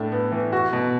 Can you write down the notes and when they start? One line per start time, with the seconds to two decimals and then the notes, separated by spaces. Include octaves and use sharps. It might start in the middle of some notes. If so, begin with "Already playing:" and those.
Already playing: A2 D4
0.12 B3
0.32 E3
0.52 F#4
0.73 B2